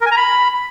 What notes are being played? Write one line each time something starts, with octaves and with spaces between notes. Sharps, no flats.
A#4
G#5
A#5
B5